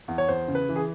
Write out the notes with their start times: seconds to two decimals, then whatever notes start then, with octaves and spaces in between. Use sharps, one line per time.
0.08 E2
0.18 C#5
0.28 E2 C5
0.48 C#3
0.55 B4
0.69 E3
0.76 G#4